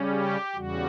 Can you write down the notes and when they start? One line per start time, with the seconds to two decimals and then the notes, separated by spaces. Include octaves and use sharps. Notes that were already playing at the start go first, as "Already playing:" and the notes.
Already playing: C#3 G3 C#4
0.10 G4
0.55 E2 C#3 G3 F#4